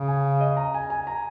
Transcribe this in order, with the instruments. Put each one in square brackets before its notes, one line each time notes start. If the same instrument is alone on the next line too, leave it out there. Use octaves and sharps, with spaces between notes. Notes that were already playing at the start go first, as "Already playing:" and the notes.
Already playing: [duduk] C#3
[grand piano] G#5
D#5
A#5
G#5
G#5
A#5